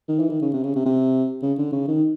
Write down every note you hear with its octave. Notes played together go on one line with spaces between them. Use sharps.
D#3
E3
D#3
C#3
C3
C#3
C3
C3
C#3
D3
C#3
D#3